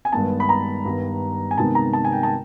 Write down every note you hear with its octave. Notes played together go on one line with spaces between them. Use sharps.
G#5
G2 D#3 G#3 B3 A5
B5
A#5
G2 D#3 G3 B3
G#5
C3 D#3 G#3 B3 D#4 A5
A#5
A5
G#5
G5
A5